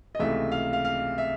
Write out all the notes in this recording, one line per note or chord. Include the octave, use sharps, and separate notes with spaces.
D#5
C#2 C3 E3 A3 E5
F5
F5
F5
E5